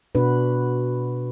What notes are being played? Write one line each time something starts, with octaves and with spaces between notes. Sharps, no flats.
B2 D4 F#4 B4